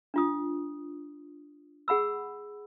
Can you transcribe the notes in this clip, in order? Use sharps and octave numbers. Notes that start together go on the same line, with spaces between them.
D4 F4 D#6
G#4 F#5 B5 E6